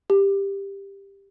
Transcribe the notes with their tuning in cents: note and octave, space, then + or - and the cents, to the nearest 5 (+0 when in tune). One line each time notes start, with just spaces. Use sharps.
G4 +10